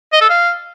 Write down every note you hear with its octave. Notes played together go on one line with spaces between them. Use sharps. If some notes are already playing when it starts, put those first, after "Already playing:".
D#5
A4
F5